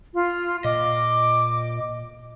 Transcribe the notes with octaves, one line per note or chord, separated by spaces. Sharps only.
F4
A#2 D#5 D6